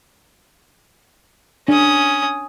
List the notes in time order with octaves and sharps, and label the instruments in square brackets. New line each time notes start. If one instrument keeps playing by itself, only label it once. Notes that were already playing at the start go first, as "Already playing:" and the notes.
[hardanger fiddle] C#4 D#6 [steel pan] D4